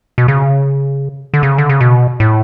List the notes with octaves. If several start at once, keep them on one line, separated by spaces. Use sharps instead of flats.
B2
C#3
D3
C#3
D3
C#3
B2
A2